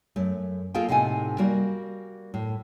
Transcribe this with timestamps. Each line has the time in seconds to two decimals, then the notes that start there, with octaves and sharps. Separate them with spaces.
0.16 F#2 A3
0.74 A#3 F4 G#4 A4 F5 G5
0.89 A2 C3 D#4 F#5 G#5
1.38 G3 A#3 F#4 A#4
2.34 A2